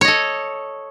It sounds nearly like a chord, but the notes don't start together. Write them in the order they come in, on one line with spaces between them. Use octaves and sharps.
C#5 D#5 A4